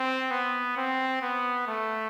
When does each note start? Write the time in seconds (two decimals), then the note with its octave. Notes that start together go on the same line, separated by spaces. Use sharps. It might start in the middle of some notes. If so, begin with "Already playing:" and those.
Already playing: C4
0.31 B3
0.77 C4
1.22 B3
1.67 A3